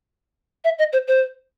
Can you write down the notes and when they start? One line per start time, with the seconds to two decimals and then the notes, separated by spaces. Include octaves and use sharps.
0.64 E5
0.79 D#5
0.93 C5
1.08 C5